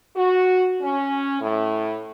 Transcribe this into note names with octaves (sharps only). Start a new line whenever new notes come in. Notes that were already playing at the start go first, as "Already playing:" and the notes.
F#4
C#4
A2